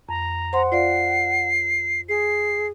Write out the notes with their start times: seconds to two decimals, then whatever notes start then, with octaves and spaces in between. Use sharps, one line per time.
0.09 F2 A#5
0.53 C5 F#5 C6
0.72 F4 D5 F5 C7
2.09 G#4 C7